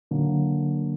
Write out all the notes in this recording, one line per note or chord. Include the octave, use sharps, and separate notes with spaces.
D3 F#3 A#3